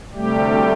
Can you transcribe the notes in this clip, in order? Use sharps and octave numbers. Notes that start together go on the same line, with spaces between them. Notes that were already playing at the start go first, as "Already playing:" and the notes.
D2 C3 G3 A3 G4